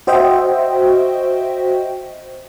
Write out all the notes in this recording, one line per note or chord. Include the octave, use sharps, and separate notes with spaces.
F#4 C5 D#5 E5 G5